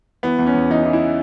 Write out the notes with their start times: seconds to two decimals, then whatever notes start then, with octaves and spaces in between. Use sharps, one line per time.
0.23 E3 B3
0.39 E2
0.46 C#4
0.54 E2
0.70 E3 D#4
0.85 E3
0.93 E4